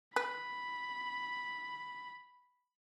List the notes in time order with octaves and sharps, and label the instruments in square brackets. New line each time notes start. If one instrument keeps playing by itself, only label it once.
[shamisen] B4 [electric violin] B5